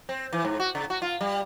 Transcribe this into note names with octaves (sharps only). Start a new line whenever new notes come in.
C4
E3
G#2
F#4
C#3
F#4
F4
G3